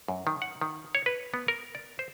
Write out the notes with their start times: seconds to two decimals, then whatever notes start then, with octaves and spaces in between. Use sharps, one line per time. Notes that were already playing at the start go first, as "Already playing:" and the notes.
0.08 F#2
0.27 D#3
0.42 F#5
0.61 D#3
0.95 C#5
1.06 B4
1.34 B3
1.48 A#4
1.75 D5
1.99 C5